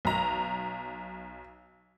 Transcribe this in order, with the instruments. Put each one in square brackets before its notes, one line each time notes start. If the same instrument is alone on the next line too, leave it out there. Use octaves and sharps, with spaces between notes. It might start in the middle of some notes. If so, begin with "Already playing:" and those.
[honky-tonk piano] B1 A#5